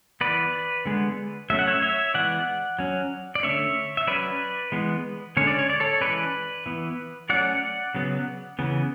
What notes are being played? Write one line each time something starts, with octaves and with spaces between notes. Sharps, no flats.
E3 B3 B4 D5
D3 G#3 B3
F#3 A3 C#4 E5
F#5
C#5 E5
C#5 E5
E3 G#3 B3 D5 F#5
F#3 C#4
D5
D3 A3 C#4 C#5 E5
E5
F#3 C#4 B4 D5
E3 G#3 B3
D3 G#3 C#4 C#5
D5
C#5
D5
A4 C#5
E3 G#3 C#4 B4 D5
E3 B3
F#3 A3 C#4 D5 F#5
C#3 F#3 B3
C#3 E3 B3